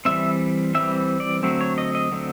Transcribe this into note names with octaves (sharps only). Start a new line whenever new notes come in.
E3 G3 C4 E5
E3 G3 C4 E5
D5
D3 F#3 A3 C4
C#5
D#5
D#5
D3 F#3 A3 C4